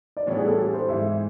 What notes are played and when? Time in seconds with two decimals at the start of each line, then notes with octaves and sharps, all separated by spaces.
0.17 D5
0.27 A2 E3 G3 B3 D4 C#5
0.37 G#4
0.47 A4
0.58 G4
0.73 C5
0.89 G#2 E3 G#3 E5